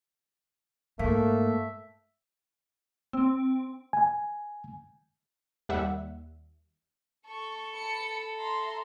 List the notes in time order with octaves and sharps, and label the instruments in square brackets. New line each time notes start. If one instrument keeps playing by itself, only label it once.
[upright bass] G#2 [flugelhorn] A3 [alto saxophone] A#3 [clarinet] E5
[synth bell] C4
[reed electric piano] G#5
[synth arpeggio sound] D#2 G3 E5 F#5
[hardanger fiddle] A4 [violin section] C#6
[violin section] A5 B5 C#7
E5 A#5 C6